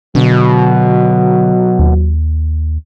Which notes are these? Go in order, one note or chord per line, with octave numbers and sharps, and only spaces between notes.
B2 D3 F#3
D#2